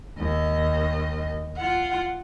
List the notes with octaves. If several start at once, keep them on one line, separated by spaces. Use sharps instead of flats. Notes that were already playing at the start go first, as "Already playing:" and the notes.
D#2 D#5
F4 F#5